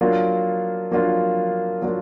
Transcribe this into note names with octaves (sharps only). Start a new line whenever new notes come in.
F#3 A#3 D4 F4
F#3 A#3 D4 F4
F#3 A#3 D4 F4